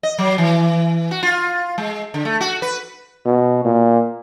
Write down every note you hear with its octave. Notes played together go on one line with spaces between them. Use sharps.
D#5
F#3
E3
F#4
F4
G#3
D3
A3
F#4
B4
B2
A#2